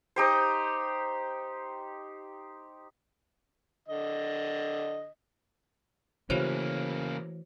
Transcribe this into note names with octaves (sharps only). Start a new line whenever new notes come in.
D#4 G4 C5
D3 D#5
C#3 E3 A3 A#3 C#4 F#4 C5 C#5